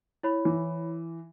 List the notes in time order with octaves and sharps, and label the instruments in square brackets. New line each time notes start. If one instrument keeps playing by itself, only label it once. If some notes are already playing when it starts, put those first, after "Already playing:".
[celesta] E4 C#5 B5
[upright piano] E3